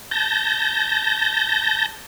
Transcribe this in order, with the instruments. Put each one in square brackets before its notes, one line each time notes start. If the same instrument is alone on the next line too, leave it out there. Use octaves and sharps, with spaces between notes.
[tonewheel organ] A5 G6 A#6